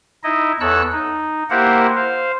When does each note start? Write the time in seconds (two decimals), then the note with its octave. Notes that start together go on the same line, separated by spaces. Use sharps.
0.24 D#4 E4 D#5
0.60 E2 A4 C#5 E6 F#6
0.92 D#4
1.50 A#3 E4 G4 A#4 C5 F#5
1.95 C5 F5